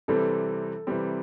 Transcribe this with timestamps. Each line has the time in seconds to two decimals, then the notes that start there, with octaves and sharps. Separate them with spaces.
0.08 C3 E3 G3 C4 A4
0.87 C3 E3 G3 C4